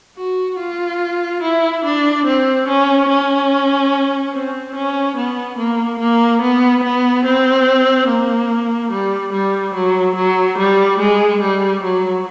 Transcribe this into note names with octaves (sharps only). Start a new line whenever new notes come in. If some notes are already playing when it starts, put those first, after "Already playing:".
F#4
F4
E4
D4
C4
C#4
C#4
C4
C#4
B3
A#3
A#3
B3
B3
C4
A#3
G3
G3
F#3
F#3
G3
G#3
G3
F#3